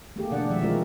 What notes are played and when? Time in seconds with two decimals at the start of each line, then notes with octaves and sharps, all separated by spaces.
0.16 A3 A#3 G4 G#4
0.31 B2 D3 E3 D4 D5 F#5
0.48 D#3 F3 G#3 E5
0.61 E3 G#3 C4 F4 F#4 A#4